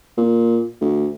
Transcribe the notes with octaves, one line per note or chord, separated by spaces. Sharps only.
A#2
D2